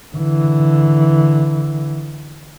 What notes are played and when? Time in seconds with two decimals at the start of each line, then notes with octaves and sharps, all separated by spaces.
0.15 D3 E3